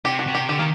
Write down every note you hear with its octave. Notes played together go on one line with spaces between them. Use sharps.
C3 G4
F#4
C3
G4
D3 G4
D#3 A#3